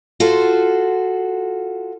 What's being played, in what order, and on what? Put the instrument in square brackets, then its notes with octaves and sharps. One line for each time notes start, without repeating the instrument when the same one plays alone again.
[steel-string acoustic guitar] F4 F#4 A4 C5